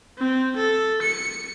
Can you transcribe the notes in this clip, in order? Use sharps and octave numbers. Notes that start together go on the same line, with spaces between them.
C4
A4
C#7